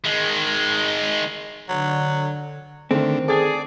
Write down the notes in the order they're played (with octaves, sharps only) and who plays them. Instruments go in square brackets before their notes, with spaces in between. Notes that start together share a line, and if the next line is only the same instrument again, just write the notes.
[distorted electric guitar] D#3 G#3
[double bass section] D3 [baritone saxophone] F#3
[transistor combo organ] D3 [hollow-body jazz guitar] D#3 C4 [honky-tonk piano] A3
[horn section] G#4 [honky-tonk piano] A4 A6 [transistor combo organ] D5